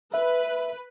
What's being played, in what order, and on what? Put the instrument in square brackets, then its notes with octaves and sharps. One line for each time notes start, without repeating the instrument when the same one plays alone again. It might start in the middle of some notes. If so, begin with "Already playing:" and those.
[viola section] B4 [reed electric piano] E5